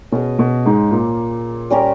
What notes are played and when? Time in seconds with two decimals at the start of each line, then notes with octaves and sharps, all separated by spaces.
0.12 B2 C#4 G#4 D#5
0.39 B2
0.65 G#2 G#3
0.91 A#2 A#3
1.70 G3 C#4 G4 A#4